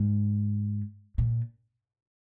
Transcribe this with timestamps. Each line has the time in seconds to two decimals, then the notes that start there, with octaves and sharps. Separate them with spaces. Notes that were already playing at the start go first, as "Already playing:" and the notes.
Already playing: G#2
1.18 A#2